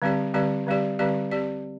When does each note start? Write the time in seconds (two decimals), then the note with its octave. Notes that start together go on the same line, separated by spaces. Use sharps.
0.02 D3 G3 C4 G4 D5
0.34 D3 G3 C4 G4 D5
0.66 D3 G3 C4 G4 D5
0.99 D3 G3 C4 G4 D5
1.32 C4 G4 D5